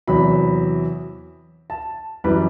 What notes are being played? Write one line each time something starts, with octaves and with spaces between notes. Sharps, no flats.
E2 C3 F#3 B5
A5
F#2 E3 G3 B4